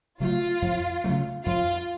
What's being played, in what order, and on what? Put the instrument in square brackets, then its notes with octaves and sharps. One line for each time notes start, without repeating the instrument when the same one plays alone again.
[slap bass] C#3 F#3 A3 [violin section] F4
[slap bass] F2
C#3 F#3 A3
[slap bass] F2 [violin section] F4